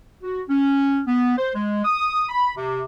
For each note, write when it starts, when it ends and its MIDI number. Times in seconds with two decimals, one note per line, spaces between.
0.23 0.41 66
0.49 1.00 61
1.06 1.35 59
1.37 1.50 72
1.54 1.81 56
1.85 2.25 87
2.29 2.51 83
2.56 2.82 48